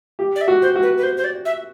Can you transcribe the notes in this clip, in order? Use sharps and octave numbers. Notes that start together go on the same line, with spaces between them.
G4
D5
E5
F#4
C5
F#4
B4
B4
C5
C5
D5
E5